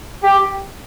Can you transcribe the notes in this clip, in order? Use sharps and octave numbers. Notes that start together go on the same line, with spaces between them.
G4